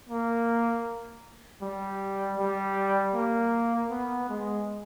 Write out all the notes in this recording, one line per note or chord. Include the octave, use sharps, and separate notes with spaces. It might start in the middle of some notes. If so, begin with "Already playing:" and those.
A#3
G3
G3
A#3
B3
G#3